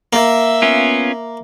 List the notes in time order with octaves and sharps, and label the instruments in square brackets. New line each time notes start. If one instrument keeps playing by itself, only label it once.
[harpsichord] A#3 [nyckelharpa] E5
[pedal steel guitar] B3 C#4 F4